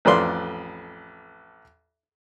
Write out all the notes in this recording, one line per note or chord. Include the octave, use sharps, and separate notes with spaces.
A1 F2 B4 D5 C6